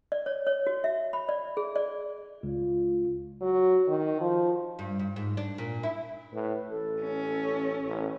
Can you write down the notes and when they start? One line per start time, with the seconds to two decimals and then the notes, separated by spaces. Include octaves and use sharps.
0.12 D5
0.26 C#5
0.47 C#5
0.67 F#4
0.84 E5
1.13 B5
1.29 D5
1.57 G#4
1.76 D5
2.43 C#2 F4
3.42 F#3
3.88 D#3
4.20 F3
4.79 G2
4.99 G2
5.16 G#2
5.37 D4
5.58 A#2
5.83 E4
6.33 A2 B4
6.70 A1 A4
7.02 C#4
7.82 A1